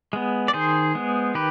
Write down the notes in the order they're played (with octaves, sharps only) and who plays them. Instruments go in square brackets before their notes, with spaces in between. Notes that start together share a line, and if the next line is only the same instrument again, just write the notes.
[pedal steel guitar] G#3 B3
D5
D#3 G#4 C5
G#3 B3
D#3 G4 B4